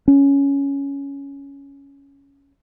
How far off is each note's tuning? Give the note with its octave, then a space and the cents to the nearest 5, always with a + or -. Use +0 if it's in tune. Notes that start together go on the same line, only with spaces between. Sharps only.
C#4 +10